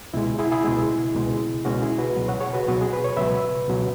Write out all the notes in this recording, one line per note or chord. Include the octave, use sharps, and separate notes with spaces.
C#2 B2 G#3 E4
E4 G#4
E4 G#4
C#2 B2 G#3
C#2 B2 G#3
C#2 B2 G#3 C#4 F#4
E4 G#4
F#4 B4
C#2 B2 F#3
C#5 F#5
G#4 C#5
F#4 B4
C#2 B2 F#3 F#4
G#4
B4
C#5
C#2 B2 F#3 B4 E5
C#2 B2 F#3